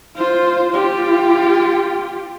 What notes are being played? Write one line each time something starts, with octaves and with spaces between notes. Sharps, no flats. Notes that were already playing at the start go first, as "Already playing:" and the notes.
F4 C5
F4 G4